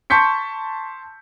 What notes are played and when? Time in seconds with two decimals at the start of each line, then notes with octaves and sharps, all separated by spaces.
0.10 A5 C6 C#6 G6 B6 C#7